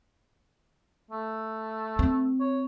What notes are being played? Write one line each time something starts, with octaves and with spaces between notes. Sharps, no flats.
A3
C4
C#5